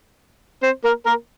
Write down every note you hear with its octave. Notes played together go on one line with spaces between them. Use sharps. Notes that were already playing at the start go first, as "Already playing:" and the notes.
C4 C5
A#3 A#4
A#3 A#4